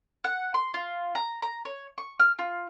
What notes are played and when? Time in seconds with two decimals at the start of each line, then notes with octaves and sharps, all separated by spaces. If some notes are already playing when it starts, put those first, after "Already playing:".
0.24 F#5
0.54 C6
0.74 F4
1.15 A#5
1.42 A#5
1.65 C#5
1.98 C#6
2.20 F6
2.39 F4